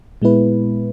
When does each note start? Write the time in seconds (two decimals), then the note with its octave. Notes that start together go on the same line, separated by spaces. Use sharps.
0.22 A#2 G#3 B3 E4 B4